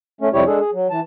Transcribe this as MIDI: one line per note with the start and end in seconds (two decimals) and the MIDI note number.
0.21 0.29 57
0.21 0.29 61
0.33 0.44 41
0.33 0.44 48
0.33 0.44 55
0.33 0.44 64
0.33 0.44 67
0.33 0.44 73
0.46 0.59 56
0.46 0.59 62
0.46 0.59 68
0.46 0.59 69
0.60 0.70 68
0.73 0.87 54
0.90 1.00 52
0.90 1.00 81